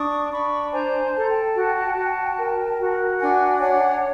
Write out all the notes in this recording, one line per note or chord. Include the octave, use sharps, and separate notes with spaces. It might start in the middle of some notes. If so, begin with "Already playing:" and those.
Already playing: D4 C#6 D#6
D4 B5 C#6
C5 G#5 A#5
A4 A5
A#5
G5 A5
F#4
F#4
A#4
F#4
D4 F#5 G#5
C#5 F#5 G#5